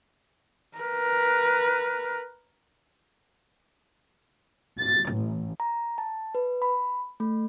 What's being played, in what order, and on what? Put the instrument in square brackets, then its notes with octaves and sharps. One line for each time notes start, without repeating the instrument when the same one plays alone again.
[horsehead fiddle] A#4 B4
[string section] A6
A1
[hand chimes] A#5
A5
B4
B5
A3